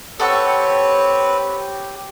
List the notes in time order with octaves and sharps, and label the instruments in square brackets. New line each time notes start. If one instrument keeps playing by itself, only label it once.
[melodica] C4 B4 [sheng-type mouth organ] G4 [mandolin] A4 F#5 C#6 [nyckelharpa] C#5